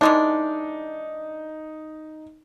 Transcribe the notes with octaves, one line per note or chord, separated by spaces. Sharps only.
E3 G#3 D4 D#4